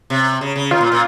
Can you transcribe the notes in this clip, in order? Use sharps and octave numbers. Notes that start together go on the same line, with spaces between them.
C3
C#3
C#3
D#3 F4
A#2
A#2